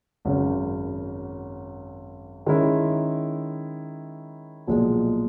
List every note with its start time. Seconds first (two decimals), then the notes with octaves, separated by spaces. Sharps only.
0.25 G#1 F#2 C#3
2.46 D#3 G#3 C#4 E4
4.67 B1 A#2 F3 G#3